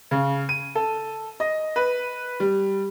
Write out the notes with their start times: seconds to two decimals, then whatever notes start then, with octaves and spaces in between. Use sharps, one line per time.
0.11 C#3
0.49 D#7
0.75 A4
1.40 D#5
1.76 B4
2.40 G3